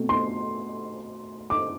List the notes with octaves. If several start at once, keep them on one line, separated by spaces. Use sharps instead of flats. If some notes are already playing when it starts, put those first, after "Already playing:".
Already playing: B2 A3 C4
C6
D6